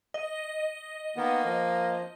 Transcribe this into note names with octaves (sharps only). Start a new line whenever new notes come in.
D#5
D#3 A#3 B3
F3